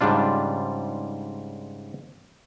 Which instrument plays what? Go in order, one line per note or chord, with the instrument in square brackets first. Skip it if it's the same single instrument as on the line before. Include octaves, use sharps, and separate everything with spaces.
[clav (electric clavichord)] G#2 C#3 G3 D4 F4